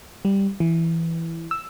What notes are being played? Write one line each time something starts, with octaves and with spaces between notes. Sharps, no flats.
G3
E3
E6